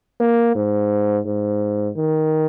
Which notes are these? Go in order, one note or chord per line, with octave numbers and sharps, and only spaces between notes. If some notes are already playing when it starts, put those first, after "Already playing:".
A#3
G#2
G#2
D#3